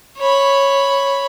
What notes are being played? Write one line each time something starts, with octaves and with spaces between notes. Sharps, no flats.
C#5 B5